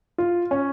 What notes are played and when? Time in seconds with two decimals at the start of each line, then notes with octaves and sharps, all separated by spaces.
0.18 F4
0.51 C#4